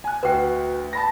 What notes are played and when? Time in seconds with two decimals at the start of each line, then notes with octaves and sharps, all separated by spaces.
0.04 G#5 F#6
0.23 D2 F#4 B4 G5
0.93 A5 B5 A#6